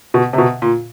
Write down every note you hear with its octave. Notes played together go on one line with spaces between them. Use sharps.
B2
C3
B2
A#2